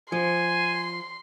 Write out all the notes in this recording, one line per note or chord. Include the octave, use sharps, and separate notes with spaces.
F3 G#5 C6